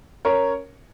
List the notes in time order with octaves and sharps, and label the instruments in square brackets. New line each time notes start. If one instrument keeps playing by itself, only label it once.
[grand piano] C#4 A#4 C#5